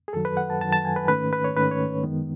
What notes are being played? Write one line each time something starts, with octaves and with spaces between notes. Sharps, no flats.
G#4
F#2 D#3 F#3 A4
B4
F#5
A5
F#2 D#3 F#3 A5
A5
G#5
B4
G#2 D#3 A3 C#4 B4
B4
C#5
G#2 D#3 A3 C#4 B4
C#5
F#2 D#3 G#3 B3